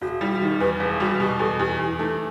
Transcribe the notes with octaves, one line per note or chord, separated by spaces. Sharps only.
E1 F#4
G3 E4
F#4
D#3 G4
E2 B4
E1
G3 F#4
B2 G4
E2 A4
E2 G4
E2 E4
A3 D#4